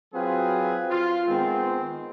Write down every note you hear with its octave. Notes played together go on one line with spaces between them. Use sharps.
F#3 C4 F4 F#4 G#4 B4
F4
D#3 G#3 B3 C4